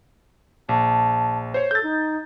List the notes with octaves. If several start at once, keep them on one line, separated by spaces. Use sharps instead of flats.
A#1 A5
C5 C#5
A4 G6 A6
D#4